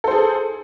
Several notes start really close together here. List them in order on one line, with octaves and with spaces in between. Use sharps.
A4 C5 G#4